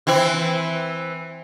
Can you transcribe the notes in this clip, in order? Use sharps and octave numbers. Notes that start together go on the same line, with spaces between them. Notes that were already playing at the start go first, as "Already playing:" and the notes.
E3 C4 E4